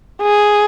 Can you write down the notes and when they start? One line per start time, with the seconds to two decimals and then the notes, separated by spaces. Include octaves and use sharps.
0.22 G#4